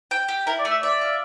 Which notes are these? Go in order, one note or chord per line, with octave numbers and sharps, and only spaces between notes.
G5
G4
E4 A#4
D5
A3
E5
D5 E5
F4